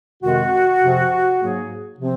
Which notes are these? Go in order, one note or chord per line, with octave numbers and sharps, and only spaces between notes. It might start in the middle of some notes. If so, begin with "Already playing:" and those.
F2 C3 D#3 G#3 F#4
F2 C3 F3 C4
G#2 F#3 A#3 G#4
C3 F3 C4